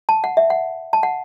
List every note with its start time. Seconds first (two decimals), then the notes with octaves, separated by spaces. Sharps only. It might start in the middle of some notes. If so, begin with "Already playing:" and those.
0.09 A5
0.24 F#5
0.37 E5
0.50 F#5
0.93 A5
1.03 F#5